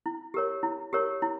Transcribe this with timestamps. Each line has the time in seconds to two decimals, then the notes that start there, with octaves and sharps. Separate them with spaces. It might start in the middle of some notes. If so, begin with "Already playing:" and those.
0.06 E4
0.34 G4 A#4 C#5
0.63 E4
0.93 G4 A#4 C#5
1.22 E4